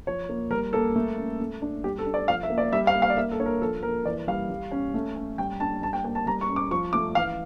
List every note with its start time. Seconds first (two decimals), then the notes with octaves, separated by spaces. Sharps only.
0.07 F3 C#5
0.29 A#3
0.51 G3 A#4
0.73 A#3 A4
0.96 A3
1.17 C#4
1.40 A3
1.62 D4
1.84 G3 G4
1.99 A4
2.06 D4
2.14 D5
2.28 F3 F5
2.43 E5
2.50 A#3
2.58 D5
2.72 G3 E5
2.87 F5
2.95 A#3
3.02 F5
3.10 D5
3.17 A#3 E5
3.31 A4
3.39 D4 C#5
3.46 A#4
3.61 F3 A4
3.83 A#3 A#4
4.05 E3 D5
4.28 G3 F5
4.50 G3
4.71 C#4
4.94 A3
5.16 C#4
5.38 G3 G5
5.60 D4 A5
5.82 G3 A5
5.93 G5
6.04 A#3 G5
6.15 A5
6.26 G3 A#5
6.41 C#6
6.49 C#4
6.56 D6
6.71 F3 C#6
6.93 A3 D6
7.15 E3 F5